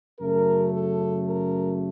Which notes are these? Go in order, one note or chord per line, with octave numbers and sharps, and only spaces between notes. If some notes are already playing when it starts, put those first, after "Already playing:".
F#2 C#3 F#3 A3 A#4
A4
A#4